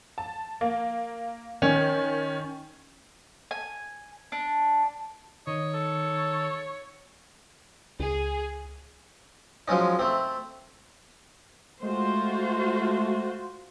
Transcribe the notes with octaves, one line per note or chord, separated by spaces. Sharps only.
A5
A#3
D#3 C#4
G#5
D4
D#3 C#5 D#5
A4
C#2 G#4
F3 F#3 G#3 C#4 D#4
A3 C4
G#3 A3 F4 F#4 C5